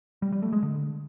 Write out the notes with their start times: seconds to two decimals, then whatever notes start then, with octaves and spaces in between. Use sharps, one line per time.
0.22 G3
0.32 G3
0.42 A3
0.52 G#3
0.63 D3